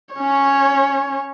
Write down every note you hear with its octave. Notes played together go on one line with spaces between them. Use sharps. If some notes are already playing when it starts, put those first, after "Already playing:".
C#4 C#5